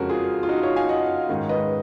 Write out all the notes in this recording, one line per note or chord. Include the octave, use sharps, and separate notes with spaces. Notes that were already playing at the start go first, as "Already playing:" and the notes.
Already playing: F2 C#3 G#3 C#4 F#4 A#4
F4 G#4
F4
D#4 F#4
C#5 F5
F5 G#5
D#5 F#5
G#2 D#3 G#3 C#4
B4 D#5